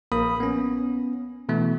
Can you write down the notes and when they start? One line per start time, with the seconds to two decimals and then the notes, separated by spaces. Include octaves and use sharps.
0.12 A#1 A#3 A#4 B5 D#6
0.40 B3 C#4
1.49 B2 E3 A3 B3